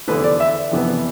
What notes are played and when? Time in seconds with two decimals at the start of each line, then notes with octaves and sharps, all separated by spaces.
0.07 F1 E2 D3 A3 E4 B4
0.24 D5
0.40 E5
0.71 F2 C3 E3 B3